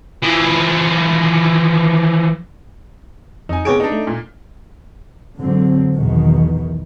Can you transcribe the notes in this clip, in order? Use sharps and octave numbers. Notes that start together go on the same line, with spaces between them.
E3 F3
F2 D#4 G#5
F1 B3 G4 G#4 C#5 D7
D4 D#4
A3
A#2
G#2 D3 F#3 C4
B1 E2 B2 D#3